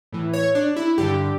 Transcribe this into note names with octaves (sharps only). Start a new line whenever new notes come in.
A2 E3
C#5
D4
E4
G2 D3 G4